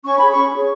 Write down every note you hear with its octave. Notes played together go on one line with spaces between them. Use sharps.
C#4 C#6
G#4 C#5 B5
C#4 C#6
G#4 C#5